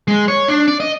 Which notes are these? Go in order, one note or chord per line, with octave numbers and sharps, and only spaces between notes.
G#3
C#5
D4
D5
D#5